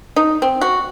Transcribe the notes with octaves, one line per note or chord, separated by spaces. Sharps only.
D#4
C4
F#4